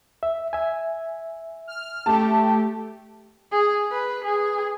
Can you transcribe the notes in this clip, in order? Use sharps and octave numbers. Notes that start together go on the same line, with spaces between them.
E5
E5 G#5
F6
A3 G4 A5
G#4
B4
G#4